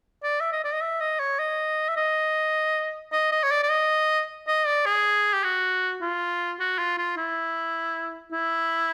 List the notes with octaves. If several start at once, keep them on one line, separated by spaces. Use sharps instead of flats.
D5
E5
D#5
D5
D#5
E5
D#5
C#5
D#5
E5
D#5
D#5
D#5
C#5
D5
D5
D#5
D#5
D5
G#4
G4
F#4
F4
F#4
F4
F4
E4
E4